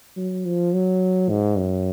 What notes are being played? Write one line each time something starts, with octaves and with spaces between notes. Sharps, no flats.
F#3
F3
F#3
G#2
F#2